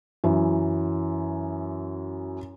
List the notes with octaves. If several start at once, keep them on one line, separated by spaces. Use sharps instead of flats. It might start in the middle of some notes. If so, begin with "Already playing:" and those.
F#2 E3